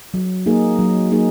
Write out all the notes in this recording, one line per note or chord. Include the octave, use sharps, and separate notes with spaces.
F#3
A#3 D#4 G#4
F#3
A#3 D#4 G#4